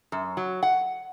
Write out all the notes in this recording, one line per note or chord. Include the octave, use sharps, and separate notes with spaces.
F#2
F#3
F#5